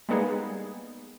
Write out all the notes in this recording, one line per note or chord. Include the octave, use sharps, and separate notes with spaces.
G3 G#3 A#3 B3 D#4 G#4